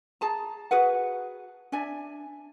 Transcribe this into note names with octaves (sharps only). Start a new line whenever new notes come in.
G#4 A5 A#5
F#4 G#4 B4 F#5
D4 D5 E5 G#5